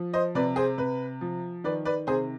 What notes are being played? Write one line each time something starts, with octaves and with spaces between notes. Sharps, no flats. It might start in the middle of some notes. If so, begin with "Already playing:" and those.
Already playing: F3
C5 D#5
C3 B4 D5
G#4 C5
C3 B4
F3
D#3 B4 D5
B4 D5
C3 G#4 C5